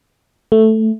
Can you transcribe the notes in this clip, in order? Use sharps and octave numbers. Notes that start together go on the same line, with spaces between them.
A3